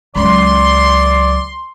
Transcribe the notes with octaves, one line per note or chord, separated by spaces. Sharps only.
C#2 F#3 D5 C6